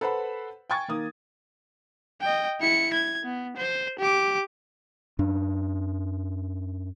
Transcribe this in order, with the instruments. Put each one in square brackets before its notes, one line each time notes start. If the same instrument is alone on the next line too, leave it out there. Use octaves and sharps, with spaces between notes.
[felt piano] A4 B4 C5 F#5 B5
G5 G#5 C#6 G#6 A6
D#3 A#3 D#6
[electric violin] D#5 G5
E4 C#7
G#6
B3
C5
G4 D6
[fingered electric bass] F#2 D4